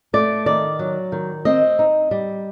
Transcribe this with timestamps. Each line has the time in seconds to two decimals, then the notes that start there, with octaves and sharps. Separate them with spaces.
0.13 A3 D5
0.46 D#3 D5
0.79 F#3
1.12 D#3
1.45 C4 D#5
1.79 D#4
2.11 G3